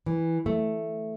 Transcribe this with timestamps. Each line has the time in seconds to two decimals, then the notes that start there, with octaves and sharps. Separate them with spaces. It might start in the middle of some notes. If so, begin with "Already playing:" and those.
0.06 E3
0.46 A3